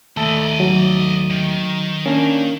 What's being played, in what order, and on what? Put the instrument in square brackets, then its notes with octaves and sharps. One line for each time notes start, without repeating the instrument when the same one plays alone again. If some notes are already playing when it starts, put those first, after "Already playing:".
[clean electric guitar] D#2 A3 A4 [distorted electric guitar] D5 D#5
[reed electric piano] F#3
[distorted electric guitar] D#3
[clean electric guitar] A#3 D4 [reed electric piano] C#4